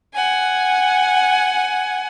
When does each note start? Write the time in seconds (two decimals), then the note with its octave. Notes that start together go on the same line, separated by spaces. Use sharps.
0.14 F#5 G#5